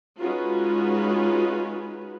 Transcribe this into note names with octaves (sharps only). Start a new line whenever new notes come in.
G#3 C#4 D#4 F4 F#4 B4